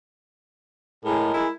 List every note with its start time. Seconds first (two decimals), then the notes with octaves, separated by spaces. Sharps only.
1.05 A2 G#3 G#4 A#4
1.34 E4